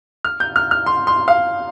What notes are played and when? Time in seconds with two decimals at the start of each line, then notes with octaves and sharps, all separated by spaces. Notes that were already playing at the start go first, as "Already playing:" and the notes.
0.25 F6
0.40 G6
0.56 F6
0.71 F6
0.86 C6
1.07 C6
1.28 F5